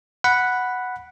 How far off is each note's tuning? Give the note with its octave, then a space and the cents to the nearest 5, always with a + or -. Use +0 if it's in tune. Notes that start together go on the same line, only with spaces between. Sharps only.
F#5 +0 B5 +0